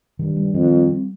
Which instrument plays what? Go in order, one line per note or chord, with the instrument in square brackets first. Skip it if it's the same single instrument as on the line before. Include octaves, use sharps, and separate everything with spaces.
[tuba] G2 [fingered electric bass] D#3
[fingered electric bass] G3
[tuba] F2 [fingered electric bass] D#3
[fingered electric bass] G3
C4